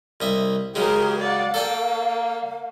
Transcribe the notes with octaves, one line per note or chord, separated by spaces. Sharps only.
C2 D#5 E5
C#3 F#3 G#3 G4 G#4 A#4
D5 F5 F#5
A#3 A4 D5 G5